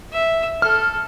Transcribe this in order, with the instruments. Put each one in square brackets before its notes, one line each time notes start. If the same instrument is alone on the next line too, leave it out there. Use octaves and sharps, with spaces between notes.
[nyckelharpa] E5
[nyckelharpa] A4 [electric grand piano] F6